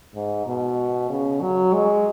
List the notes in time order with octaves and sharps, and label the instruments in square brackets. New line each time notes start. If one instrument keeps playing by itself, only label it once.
[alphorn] G#2
B2
C#3
F#3
G#3